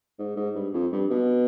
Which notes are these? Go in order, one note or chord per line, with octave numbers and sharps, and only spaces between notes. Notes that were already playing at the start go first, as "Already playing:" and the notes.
G#2
G#2
G2
F2
G2
B2